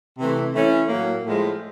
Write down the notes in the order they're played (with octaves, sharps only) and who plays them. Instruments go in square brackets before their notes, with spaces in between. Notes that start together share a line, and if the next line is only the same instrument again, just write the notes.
[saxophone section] C3 E3 A3
E3 A3 C#4
A2 F#3 A#3
A2 F3 G#3